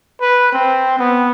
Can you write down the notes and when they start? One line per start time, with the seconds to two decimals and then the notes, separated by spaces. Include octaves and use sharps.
0.21 B4
0.52 C4
0.99 B3